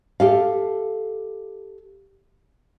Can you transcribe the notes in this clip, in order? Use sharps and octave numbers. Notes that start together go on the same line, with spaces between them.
G4 A4 F5